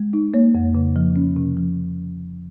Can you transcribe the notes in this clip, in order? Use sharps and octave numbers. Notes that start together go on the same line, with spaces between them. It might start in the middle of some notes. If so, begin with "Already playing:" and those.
Already playing: G#3
D#4
A#3 C#5
F2
C#3
F3
C#4
C3
F3